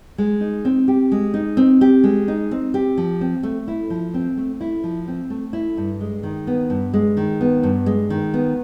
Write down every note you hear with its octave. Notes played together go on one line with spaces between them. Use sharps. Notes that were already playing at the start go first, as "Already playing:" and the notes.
G#3
D#4
C4
G4
G#3
D#4
C4
G4
G#3
D#4
C4
G4
F3
C4
A3
E4
F3
C4
A3
E4
F3
C4
A3
E4
G2
G#3
D#3
B3
G2
G#3
D#3
B3
G2
G#3
D#3
B3